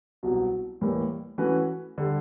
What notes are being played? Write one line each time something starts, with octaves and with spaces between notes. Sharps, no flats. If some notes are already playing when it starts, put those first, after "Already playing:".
C2 B2 F#3
A2 E3 G3 A#3
E3 A3 C#4 F#4 B4
D3 G3